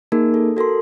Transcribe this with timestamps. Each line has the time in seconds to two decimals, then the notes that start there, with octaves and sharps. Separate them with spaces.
0.12 A#3 D#4 G#4 A#4
0.34 A4
0.57 F#4 A4 A#4 C6